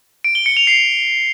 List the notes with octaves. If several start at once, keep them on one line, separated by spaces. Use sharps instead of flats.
D7
G7
C#7
F7
C7